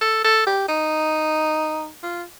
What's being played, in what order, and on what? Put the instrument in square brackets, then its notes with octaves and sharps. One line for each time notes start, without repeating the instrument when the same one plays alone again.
[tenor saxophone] A4
A4
G4
D#4
F4